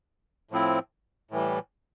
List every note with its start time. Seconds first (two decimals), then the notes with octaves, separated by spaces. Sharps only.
0.51 A2 F3 C4 E4
1.31 A2 E3 G3